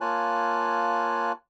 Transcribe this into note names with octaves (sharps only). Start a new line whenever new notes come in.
A#3 F4 C#5 G#5 A5 F#6